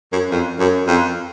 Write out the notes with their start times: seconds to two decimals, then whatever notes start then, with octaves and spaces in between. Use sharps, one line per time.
0.12 F#2
0.31 F2
0.59 F#2
0.88 F2